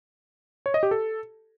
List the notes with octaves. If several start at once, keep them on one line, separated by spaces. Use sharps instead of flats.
C#5
D#5
G4
A4